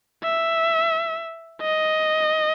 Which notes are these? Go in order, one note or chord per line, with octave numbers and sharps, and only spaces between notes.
E5
D#5